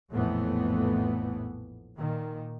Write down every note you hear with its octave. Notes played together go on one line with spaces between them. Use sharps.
A#1 F2 A2 E3 A3 B3
A#2 D#3